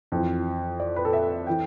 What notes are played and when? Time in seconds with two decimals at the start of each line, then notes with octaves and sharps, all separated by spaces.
0.12 F2 E3
0.80 D5
0.96 B4
1.05 A4
1.13 E5
1.47 E3 G5